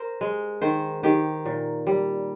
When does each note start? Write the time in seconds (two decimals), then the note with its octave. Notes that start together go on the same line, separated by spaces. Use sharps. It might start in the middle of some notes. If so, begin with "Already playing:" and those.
Already playing: A#4 C5
0.21 G#3
0.61 D#3 C5
1.03 D#3 G4
1.46 A#2
1.87 G3